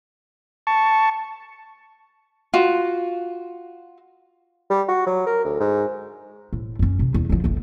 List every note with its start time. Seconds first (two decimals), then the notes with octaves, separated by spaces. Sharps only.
0.67 A5 C#6
2.54 F4 F#4
4.70 G3
4.88 F#4
5.07 F#3
5.26 A#4
5.44 D2
5.59 G#2
6.53 A2
6.79 F#2 C#4
6.99 C3
7.14 E2
7.30 C#3 F3
7.44 G1 E2